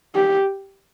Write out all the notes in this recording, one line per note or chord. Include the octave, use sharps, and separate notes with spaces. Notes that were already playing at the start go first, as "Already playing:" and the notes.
G4